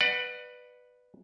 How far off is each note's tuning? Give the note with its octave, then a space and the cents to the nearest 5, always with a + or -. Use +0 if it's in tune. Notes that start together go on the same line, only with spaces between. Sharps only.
B4 +0 D5 +35 F#5 +0